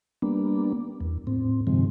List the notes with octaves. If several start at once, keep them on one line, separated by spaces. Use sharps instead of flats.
G3 A#3 B3 D4
E2
A2 C4
G2 C3 D#3 F3 G#3 C4